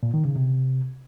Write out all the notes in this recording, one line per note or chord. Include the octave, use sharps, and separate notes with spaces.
A#2
D#3
C#3
C3